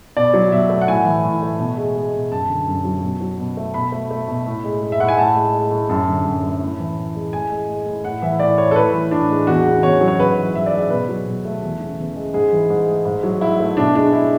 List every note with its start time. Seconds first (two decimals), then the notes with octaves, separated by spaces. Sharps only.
0.16 B2 D5
0.34 F#3
0.51 B2 E5
0.70 A3
0.81 F#5
0.87 A2 G#5
1.05 E3
1.24 A2
1.42 A3
1.60 B2
1.77 G#3
1.96 G#3
2.13 B2
2.31 F#2 A5
2.49 D3
2.68 F#2
2.85 F#3
3.03 B2
3.21 F#3
3.38 B2
3.57 A3
3.74 B2 B5
3.92 A3
4.11 A3
4.28 B2
4.46 A2
4.64 G#3
4.81 G#3
4.92 E5
5.00 A2 F#5
5.08 G#5
5.17 A2 A5
5.35 G#3
5.54 G#3
5.71 A2
5.89 F#2 A5
6.07 D3
6.25 F#2
6.43 A3
6.60 A2
6.80 E3
6.96 A2
7.15 G#3
7.33 A2 G#5
7.51 G#3
7.69 G#3
7.86 A2
8.04 A2 F#5
8.22 E3 E5
8.39 A2 D5
8.58 A3 C#5
8.71 A4
8.76 A2 B4
8.93 E3
9.11 A2 D4
9.30 G#3
9.47 E2 F#4
9.66 C#3
9.83 E2 C#5
10.01 F#3
10.08 C#5
10.19 G#2 B4
10.37 E3
10.55 G#2 E5
10.66 D5
10.72 G#3 E5
10.90 B2 B4
11.09 F#3
11.27 B2
11.45 A3
11.62 E2
11.80 C#3
11.99 E2
12.16 G#3
12.34 G#2 G#4
12.52 E3
12.70 G#2
12.88 A3
13.05 G#2
13.23 F#3
13.41 G#2 E4
13.60 A3
13.77 B2 D4
13.95 G#3 D4
14.13 G#3 E4